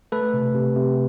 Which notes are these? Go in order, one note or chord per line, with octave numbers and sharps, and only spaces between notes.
A3 A4 B4
C3
C3
C3